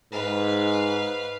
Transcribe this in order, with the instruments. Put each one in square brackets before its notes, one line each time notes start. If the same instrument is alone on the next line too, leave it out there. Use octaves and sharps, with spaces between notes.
[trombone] G#2 [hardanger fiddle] B4 F5